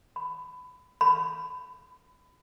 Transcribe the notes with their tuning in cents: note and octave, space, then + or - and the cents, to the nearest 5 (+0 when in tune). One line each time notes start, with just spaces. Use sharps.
B5 +20
B5 +25